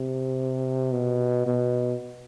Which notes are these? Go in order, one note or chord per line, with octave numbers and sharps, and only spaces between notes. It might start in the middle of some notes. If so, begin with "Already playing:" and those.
Already playing: C3
B2
B2